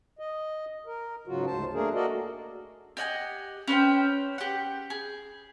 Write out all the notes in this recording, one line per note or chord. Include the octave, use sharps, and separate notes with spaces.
D#5
A#4
G#2 C#3 F#3 F4 F#4
D2 G#2 C5 A5
A3 A#3 D4 G#4 A#4
F#4 A4 A#4 D5 D#5
G4 D#5 F#5 G#5
C#4 B4 C5 G5
G4 F#5
G#4